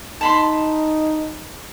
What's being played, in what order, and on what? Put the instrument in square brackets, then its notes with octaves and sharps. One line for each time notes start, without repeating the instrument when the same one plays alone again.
[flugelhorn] D#4 [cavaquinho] A5 B5 C6